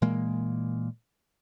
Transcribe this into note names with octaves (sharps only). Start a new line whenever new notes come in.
A#2 E3 G#3 A#3